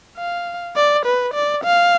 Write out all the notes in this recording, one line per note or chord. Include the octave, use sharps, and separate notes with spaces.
F5
D5
B4
D5
F5